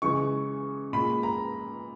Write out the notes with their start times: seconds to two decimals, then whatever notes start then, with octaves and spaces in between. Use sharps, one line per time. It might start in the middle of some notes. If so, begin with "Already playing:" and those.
0.02 C#3 E3 G#3 C#6
0.93 A#2 G#3 B5
1.23 A#5